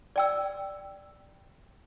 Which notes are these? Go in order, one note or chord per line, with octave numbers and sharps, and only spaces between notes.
D5 G5 E6